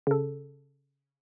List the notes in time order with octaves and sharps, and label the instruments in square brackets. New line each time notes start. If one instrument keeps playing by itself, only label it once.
[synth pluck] C#3 A4